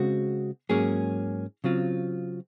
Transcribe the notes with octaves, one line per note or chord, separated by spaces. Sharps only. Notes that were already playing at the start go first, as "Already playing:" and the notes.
Already playing: C#3 G#3 C4 F#4
G#2 F#3 A#3 C#4 G#4
C#3 F#3 C4 F4